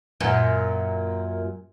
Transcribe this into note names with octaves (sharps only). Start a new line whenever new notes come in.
F#2 A#2